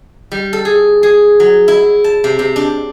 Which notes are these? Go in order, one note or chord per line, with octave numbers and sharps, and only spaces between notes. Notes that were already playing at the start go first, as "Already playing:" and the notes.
G3
A4
G#4
G#4
F#3
E4
A5
C3
C3
D4